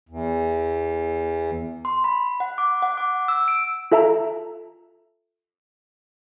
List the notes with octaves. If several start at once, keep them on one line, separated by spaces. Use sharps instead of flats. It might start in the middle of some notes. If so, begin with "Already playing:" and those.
E2
C6
B5
F#5
D6
F#5
D6
E6
D7
F4 A4 E5 A5 A#5